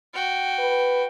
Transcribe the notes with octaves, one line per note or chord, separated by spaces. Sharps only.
F#4 G5
B4